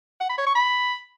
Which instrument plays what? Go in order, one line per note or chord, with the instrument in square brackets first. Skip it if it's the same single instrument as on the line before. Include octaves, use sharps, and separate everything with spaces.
[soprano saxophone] F#5
B5
C#5
C#6
B5